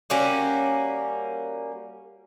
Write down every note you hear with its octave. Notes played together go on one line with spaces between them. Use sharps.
G3 A#3 C#4 F#4